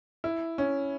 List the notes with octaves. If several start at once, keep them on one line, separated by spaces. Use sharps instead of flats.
E4
C#4